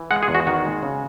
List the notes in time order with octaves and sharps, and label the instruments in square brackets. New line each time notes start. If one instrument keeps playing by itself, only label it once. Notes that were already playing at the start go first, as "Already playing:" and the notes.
Already playing: [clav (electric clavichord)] E3
G#3 F#5
G#4
E2
F#4
D#3 F#4
G#3
C#3